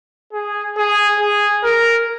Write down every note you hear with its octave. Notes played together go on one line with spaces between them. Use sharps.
G#4
G#4
G#4
A#4